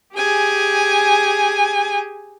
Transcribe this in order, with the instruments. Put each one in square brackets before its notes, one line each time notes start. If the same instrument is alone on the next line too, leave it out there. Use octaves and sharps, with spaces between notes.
[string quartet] G4 G#4 G#5